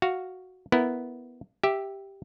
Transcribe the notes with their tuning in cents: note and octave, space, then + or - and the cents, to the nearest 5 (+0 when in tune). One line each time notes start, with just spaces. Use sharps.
F#4 +0 F5 +0
B3 +0 E4 +0 A#4 +0
G4 +0 E5 +0